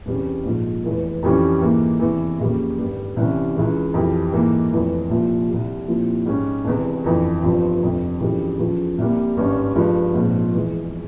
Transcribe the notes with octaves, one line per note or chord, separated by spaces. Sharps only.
E1 E2 C3 G3 C#4
A#1 G#2 F3
F1 E2 E3
F2 E3 G3 C#4
G#2 E3 A#3
E2 C3 E3
F2 C#3 G3 A#3
G#1 G2 G3
C2 C3 E3 G3 C#4
C#2 C#3 E3 G#3
F2 E3 G3
G#2 E3 A#3
F1 F2 E3
C2 A#2 F3
C2 C3 G3
A#2 F3 C4 E4 G4
G#2 G3 C#4 G4
E1 E2 C3
G1 F2 E3
G1 G2 F3 C4
G1 F2 C3
G1 F2 C#3 E3 G3
E2 C#3 F3
C2 C3 G3 A#3
G#1 G2 G3 C#4
G1 G2 F3 G#3
A#1 G#2 F3 C4 F4
E1 E2 E3 G#3